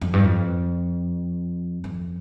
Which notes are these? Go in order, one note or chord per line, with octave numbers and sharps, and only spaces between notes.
F2
G2
F2
F2